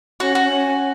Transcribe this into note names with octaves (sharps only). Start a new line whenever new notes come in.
C#4 F#4
F#4
C#4